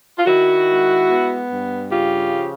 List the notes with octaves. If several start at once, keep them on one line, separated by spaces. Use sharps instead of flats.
F4
D#3 E4 F#4
G#3
B3
G2
C#3 F4 G4
F3